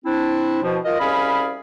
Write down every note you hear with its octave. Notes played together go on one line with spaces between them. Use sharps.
C4 D4 E4
B2 F3
F4 A#4 D#5
C2 C#4 G#4 D5 F5 B5